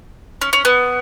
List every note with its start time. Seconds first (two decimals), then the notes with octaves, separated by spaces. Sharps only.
0.41 C#4
0.53 C#4
0.65 B3